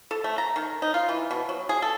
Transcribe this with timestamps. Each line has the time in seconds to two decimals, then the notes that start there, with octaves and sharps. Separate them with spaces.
0.11 A4
0.24 A3
0.38 A#5
0.56 D#3
0.82 D#4
0.94 F4
1.09 E3
1.31 B2
1.49 F#3
1.69 G#4
1.82 A4